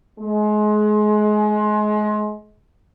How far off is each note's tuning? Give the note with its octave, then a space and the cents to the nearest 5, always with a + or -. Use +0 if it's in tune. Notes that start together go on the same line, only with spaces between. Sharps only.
G#3 +30